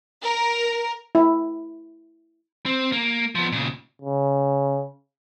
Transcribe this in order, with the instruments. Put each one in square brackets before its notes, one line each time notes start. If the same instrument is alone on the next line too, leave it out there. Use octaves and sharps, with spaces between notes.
[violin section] A#4
[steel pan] E4
[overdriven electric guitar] C4
A#3
F3 B3
A#2 C#3
[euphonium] C#3